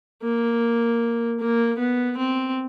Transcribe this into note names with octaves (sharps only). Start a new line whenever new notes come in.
A#3
A#3
B3
C4